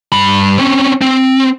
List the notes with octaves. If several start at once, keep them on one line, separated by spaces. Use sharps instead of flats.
G2 B5
C4 C#4
C4